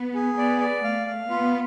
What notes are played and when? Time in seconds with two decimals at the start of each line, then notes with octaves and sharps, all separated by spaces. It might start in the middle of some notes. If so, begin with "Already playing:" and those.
Already playing: B3
0.14 G#4
0.37 B3 D5
0.61 D5
0.84 A3 F5
1.07 F5
1.30 B3 F4